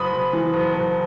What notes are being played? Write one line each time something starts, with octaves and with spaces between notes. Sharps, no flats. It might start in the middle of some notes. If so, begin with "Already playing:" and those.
Already playing: F#1 B5 D#6
F#1
E3
F#1
F#1